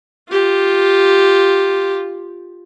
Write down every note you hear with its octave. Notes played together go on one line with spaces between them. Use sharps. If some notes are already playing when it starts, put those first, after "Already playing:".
F4 G4